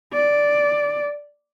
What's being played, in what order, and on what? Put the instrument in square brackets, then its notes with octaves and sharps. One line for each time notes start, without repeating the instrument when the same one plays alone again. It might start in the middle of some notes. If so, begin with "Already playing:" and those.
[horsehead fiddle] D5